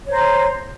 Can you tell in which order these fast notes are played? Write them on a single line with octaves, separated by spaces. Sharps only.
C#5 C5 A#5 C6